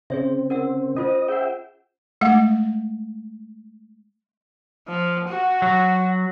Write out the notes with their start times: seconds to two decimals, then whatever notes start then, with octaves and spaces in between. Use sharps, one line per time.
0.10 C#3 C4 G#4 C#5 E5
0.50 A#4 F#5 E6
0.97 C#4 F4 C5 D#5
1.28 G#4 E5 F#5 G5
2.21 G#3 A3 F5 F#5
4.88 F3
5.28 F#4
5.62 F#3